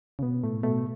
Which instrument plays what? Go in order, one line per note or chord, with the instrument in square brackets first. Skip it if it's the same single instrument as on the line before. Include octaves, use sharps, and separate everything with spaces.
[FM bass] C#3
[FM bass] B2 [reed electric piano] B3
[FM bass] A2 [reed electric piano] A3
[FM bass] B2 [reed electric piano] A3